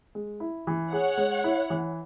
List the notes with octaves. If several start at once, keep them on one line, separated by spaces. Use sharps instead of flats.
G#3
E4
E3
G#4 C#5 F#5
G#3
E4
E3